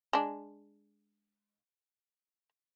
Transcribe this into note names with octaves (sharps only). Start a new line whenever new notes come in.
G#3 D4